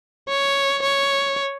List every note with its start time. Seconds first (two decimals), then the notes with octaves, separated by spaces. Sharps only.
0.28 C#5
0.82 C#5